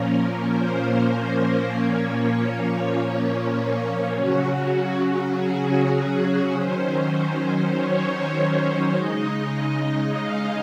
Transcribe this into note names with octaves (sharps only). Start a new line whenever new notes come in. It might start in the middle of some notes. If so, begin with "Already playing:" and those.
Already playing: A#2 F3 A#3 C#4 A#4
C5
A#2 F3 A#3 C#4 C#5
C#3 F#3 C#4 F#4
G#4
D#3 F#3 C#4 C5
C#5
C#3 G#3 D#4 D#5
F5